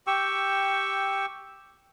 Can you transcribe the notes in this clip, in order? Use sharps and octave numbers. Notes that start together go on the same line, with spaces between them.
G4 G5 C#6 E6